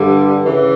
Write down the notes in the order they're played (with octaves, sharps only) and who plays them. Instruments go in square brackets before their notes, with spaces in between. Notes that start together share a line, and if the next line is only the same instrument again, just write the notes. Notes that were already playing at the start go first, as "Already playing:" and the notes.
Already playing: [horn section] G2 D3 G3
C#3 E3